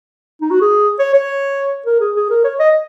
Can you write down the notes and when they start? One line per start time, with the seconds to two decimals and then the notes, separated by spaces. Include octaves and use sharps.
0.42 D#4
0.51 F#4
0.61 G#4
0.99 C#5
1.14 C#5
1.86 A#4
2.01 G#4
2.16 G#4
2.30 A#4
2.44 C#5
2.60 D#5